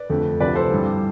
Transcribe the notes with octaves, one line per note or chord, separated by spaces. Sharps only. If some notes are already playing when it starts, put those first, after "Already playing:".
Already playing: B4 D5
F2 D3 A3
D2 C3 F3 B4 D5
A4 C5
G2 E3 G3